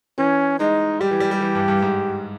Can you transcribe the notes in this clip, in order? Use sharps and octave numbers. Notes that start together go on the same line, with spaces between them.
E3 C#4
G#3 D#4
G3 G4
E3
G3
G3
E3
G2
G2
G#2